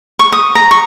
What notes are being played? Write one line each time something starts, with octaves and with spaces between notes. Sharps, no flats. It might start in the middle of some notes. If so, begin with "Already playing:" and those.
C#6
D#6
A#5
C#6